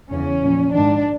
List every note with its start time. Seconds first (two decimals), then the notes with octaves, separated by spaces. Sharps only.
0.11 E2 C#3 E3 C#4
0.41 A#2 F3
0.72 G#2 D#3 D4